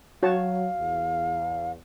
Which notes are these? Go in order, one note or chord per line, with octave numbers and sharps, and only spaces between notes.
F#3 F#4 C#5 F5 A5
E2